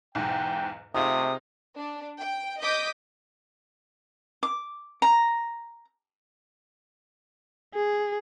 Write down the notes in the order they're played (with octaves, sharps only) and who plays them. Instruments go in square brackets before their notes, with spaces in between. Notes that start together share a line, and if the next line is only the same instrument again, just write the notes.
[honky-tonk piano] B1 E2 G#2 [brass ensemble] G5
[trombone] C3 [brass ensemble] A3 [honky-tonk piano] D#4 F4 G#4 [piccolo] D#6
[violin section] D4
G5
D#5 D6 D#6 G6 B6
[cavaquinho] D6
A#5
[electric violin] G#4